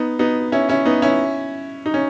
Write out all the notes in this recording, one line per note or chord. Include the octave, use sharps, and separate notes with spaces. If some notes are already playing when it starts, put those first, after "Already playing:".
Already playing: B3 D#4
B3 D#4
C#4 E4
C#4 E4
B3 D#4
C#4 E4
D#4
C#4